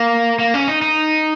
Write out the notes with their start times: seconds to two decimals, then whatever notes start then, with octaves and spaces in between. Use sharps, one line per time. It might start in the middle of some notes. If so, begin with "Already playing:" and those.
Already playing: A#3
0.39 A#3
0.54 C#4
0.68 D#4
0.82 D#4